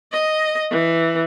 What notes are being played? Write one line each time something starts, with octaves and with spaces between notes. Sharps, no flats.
D#5
E3